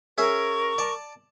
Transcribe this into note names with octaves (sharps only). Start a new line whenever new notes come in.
C#4 G#4 A#4 E5 C#6
D5 A5